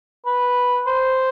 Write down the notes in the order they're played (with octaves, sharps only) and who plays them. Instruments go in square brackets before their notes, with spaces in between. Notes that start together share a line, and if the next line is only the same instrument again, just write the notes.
[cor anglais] B4
C5